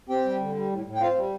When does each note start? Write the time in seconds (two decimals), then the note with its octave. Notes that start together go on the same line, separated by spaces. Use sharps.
0.09 C4 G4 G5
0.25 G3
0.40 D3
0.55 G3
0.71 A2
0.86 A2
0.95 G5
1.01 C4 F4 F5
1.16 G3